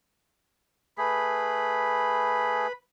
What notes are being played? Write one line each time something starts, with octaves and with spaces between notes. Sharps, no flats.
A3 G#4 B4 B5